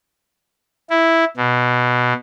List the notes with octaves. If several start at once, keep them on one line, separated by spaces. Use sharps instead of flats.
E4
B2